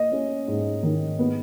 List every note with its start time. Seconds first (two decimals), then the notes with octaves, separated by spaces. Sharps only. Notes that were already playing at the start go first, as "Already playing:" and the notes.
Already playing: A#3 D#5
0.12 C#4
0.48 G#2
0.83 D#3
1.19 B3